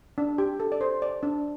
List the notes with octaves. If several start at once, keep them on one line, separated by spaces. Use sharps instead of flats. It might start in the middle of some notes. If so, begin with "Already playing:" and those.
D4
G4
A4
D5
C5
D5
D4